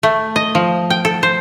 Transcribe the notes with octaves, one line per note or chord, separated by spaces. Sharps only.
A3
D#5
F3
G5
A4
C5